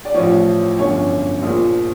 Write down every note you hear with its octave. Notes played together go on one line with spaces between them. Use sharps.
D5
A1 A2 F3 C#5
G1 F#2 D3 F3 C#5
A#1 A#2 F3